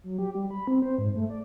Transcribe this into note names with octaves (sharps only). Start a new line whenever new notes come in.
F#3
G4
G3
B5
C4
C5
G#2
A3
D5